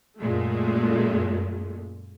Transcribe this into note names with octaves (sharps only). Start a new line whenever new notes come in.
F#2 A#2 G#3 A3